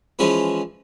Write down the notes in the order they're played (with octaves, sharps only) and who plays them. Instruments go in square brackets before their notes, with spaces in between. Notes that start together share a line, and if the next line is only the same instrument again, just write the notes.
[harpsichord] E3 F3 G#3 C#4 E4 B4